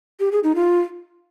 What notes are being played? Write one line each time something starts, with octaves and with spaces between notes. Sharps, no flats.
G4
G#4
D#4
F4